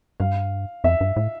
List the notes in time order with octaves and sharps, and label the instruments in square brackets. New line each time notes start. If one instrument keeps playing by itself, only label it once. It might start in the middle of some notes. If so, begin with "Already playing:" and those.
[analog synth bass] G2 [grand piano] F5
[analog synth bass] F2 [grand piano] E5
[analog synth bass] G2
A2